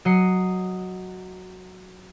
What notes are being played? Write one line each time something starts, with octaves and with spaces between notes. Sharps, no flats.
F#3 D#5 C7 C#7